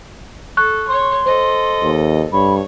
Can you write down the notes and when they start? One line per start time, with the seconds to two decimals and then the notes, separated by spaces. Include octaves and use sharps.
0.57 A4 C#6 F#6
0.88 C#5 C6
1.26 A4 C5 D#5
1.83 D#2
2.33 G2 C#5 B5